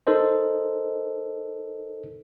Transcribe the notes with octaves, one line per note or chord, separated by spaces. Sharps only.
D#4 A4 A#4 C5 D#5